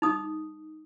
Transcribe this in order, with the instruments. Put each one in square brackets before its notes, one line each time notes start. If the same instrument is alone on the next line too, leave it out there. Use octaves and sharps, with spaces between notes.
[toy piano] D#4 D#6